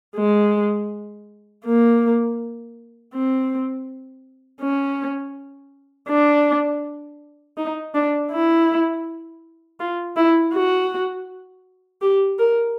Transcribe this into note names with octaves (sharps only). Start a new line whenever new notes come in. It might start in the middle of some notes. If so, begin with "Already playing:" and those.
G#3
A#3
C4
C#4
D4
D#4
D4
E4
F4
E4
F#4
G4
A#4